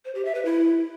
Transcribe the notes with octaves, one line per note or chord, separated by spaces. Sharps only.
C5
G4
E5
B4
E4